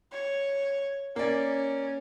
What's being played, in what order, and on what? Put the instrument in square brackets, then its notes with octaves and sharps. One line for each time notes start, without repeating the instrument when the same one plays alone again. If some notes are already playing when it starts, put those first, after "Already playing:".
[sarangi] C#5
[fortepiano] A#3 D5 [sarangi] C#4